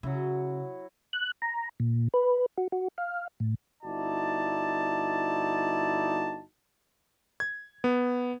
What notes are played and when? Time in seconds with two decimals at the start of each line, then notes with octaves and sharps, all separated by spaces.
0.03 C#3 F#3 E4
1.13 F#6
1.42 A#5
1.80 A#2
2.14 B4
2.58 F#4
2.72 F#4
2.98 F5
3.40 A2
3.83 G1 D#4 E4 F#4 D5 A5
7.40 G#6
7.84 B3